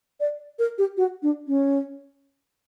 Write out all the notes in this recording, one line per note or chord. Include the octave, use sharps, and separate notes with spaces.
D5
A#4
G4
F#4
D4
C#4